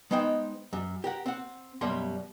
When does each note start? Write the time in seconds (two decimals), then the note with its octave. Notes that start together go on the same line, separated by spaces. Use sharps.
0.11 G#3 B3 D#4 C5 G5
0.73 F#2
1.04 G4 A#4 F#5
1.26 C4 F#5
1.81 F#2 B2 G3 A#3 C6